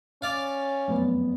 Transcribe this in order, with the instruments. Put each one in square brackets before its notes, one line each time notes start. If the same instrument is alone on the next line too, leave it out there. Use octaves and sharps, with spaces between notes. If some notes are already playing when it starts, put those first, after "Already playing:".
[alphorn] C#4 [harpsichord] D5 F5
[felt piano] F1 F#2 B3